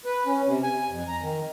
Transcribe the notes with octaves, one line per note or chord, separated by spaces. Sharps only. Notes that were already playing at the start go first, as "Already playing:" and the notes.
B4
C#4
C3
G#5
F2
A#5
D#3